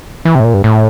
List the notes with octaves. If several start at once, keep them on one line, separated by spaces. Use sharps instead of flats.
E3
C3
A2
A#2
G2
A2